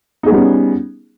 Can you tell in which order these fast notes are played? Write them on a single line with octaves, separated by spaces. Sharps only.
D#4 G#4 B3 G3 C#4